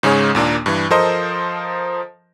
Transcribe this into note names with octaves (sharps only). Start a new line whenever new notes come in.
G#2 C#3 G#3 G#4 C#5
D#2 A#2 A#3 D4
G2 E3
F3 A4 A#4 C5 D#5